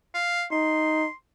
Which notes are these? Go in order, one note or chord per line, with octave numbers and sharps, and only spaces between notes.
F5
D#4 C6